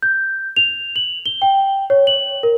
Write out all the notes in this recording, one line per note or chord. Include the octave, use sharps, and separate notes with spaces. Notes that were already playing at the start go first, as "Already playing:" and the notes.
G6
F7
F#7
G7
G5
C#5
F#7
A#4